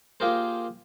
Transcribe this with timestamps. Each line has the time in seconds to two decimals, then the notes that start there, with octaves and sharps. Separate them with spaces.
0.20 A#3 F4 G4 G#4 A#4 C5